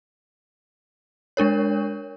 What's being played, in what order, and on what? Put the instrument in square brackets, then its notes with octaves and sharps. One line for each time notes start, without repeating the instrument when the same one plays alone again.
[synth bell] G#3 D4 A#4 C#5